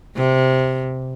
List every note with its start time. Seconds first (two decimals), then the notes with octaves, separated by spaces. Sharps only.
0.16 C3